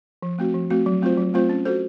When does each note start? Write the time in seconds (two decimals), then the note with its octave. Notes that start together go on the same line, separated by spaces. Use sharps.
0.22 F3
0.39 A3 C4 F#4
0.54 F3
0.70 A3 C4 F#4
0.86 F#3
1.02 A3 C4 F4 C5
1.18 F#3
1.34 A3 C4 F4 C5
1.49 C#4
1.66 F#4 A4 C5